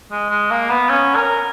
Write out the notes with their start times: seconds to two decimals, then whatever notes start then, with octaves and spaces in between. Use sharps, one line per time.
0.11 G#3
0.30 G#3
0.51 A#3
0.70 B3
0.89 C#4
1.16 A#4